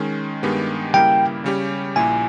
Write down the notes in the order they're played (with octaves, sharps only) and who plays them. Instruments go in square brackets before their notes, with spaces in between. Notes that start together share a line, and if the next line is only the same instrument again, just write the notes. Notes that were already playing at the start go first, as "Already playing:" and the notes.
Already playing: [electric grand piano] D#3 G#3 C#4
G2 D#3 G#3 B3 G4
[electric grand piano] C#3 G3 A#3 E4 A#4 [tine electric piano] G5
[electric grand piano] C#3 G3 C#4 G4
[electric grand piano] A#1 A#2 A#3 E4 [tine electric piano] G#5